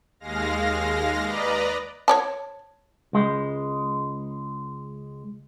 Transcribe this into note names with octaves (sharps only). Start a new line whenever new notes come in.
D#2 G#3 F5 A#6
B4 D5 D#5 A#5
C#5 D5 A5
C#2 G#3